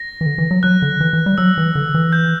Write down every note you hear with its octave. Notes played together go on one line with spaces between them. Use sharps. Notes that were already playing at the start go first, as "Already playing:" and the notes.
Already playing: A#6
E3
D3
E3
F#3
F#3 F#6
D3
E3
E3
G3
F#3 E6
E3
D3
E3
G6